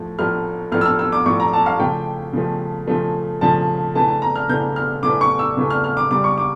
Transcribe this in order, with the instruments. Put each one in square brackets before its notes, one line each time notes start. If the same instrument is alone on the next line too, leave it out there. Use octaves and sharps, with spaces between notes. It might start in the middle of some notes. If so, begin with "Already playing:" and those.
Already playing: [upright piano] A2 F3 A3
A2 F3 A3 F6
A2 F3 A3 F6
E6
F6
E6
D6
A2 F3 A3 C#6
A#5
A5
F5
C#3 F3 A3 G5
C#3 F3 A3
C#3 F3 A3
C#3 F3 A3 A5
C#3 E3 A3 A5
A5
A#5
F6
C#3 E3 A3 G6
F6
C#3 E3 A3 D6
C#6
E6
C#3 E3 A3
F6
F6
D6
C#3 G3 D6
C#6
D6